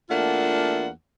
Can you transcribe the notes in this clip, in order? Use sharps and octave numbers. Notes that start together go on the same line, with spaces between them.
E2 A3 A#3 D4 F4 F#5